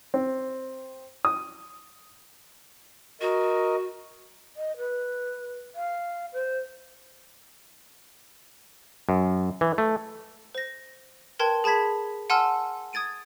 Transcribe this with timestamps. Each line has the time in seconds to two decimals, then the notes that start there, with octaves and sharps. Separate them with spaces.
0.14 C4
1.25 D#6
3.21 F#4 A#4 D#5
4.56 D#5
4.78 B4
5.75 F5
6.33 C5
9.09 F#2
9.61 E3
9.78 A3
10.55 C5 A#6
11.39 A#4 B4 G5 A5 C6 G#6
11.64 G#4 A5 B5 G#6 B6
12.30 F#5 G#5 A5 C6 E6 F6
12.93 D#6 G#6 A6 D7 D#7